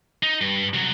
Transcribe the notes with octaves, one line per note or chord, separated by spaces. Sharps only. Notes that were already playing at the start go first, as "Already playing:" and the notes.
D#4
G2
C2 F#3